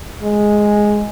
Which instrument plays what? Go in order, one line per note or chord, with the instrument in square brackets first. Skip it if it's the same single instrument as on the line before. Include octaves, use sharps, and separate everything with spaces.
[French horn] G#3